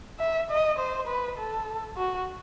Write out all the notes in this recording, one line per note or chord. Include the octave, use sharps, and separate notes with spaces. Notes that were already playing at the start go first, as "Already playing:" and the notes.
E5
D#5
C5
B4
A4
F#4